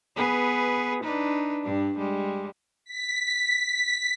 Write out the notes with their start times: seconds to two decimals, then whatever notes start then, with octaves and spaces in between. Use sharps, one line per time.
0.16 B3 G#4 B4
1.04 D4 D#4 B4
1.64 G2 D4
1.98 G3 G#3
2.85 B6